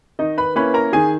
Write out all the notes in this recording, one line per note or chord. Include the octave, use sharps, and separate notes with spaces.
D#3 D#4 D#5
B4 B5
A#3 C#4 E4 B4 B5
A#4 A#5
D#3 G#4 G#5